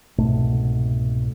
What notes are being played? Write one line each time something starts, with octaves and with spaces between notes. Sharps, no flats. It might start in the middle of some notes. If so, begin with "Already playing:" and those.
C2 G#2 B2 A3